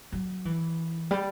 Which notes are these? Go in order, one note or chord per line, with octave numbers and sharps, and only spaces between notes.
F#3
E3
G3